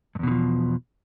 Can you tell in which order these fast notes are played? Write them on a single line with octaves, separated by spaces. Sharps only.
G2 E2 B2 D3 F3